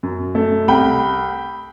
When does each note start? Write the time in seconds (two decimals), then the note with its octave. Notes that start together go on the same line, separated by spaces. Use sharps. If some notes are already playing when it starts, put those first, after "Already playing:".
0.03 F#2
0.35 A3
0.68 C2 G5 B5